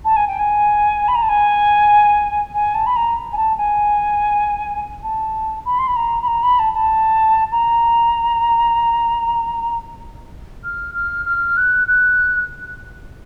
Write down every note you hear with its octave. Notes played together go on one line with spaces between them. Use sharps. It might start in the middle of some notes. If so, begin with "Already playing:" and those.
A5
G#5
G5
G#5
B5
A#5
A5
G#5
G#5
A5
B5
A#5
G#5
A5
G#5
A5
B5
C6
B5
A#5
B5
A#5
B5
A5
A5
A#5
F6
F6
F6
F#6
F#6